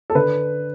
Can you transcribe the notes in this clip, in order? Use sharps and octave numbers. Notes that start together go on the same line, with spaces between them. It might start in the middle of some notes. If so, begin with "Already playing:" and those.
A4
D3 B4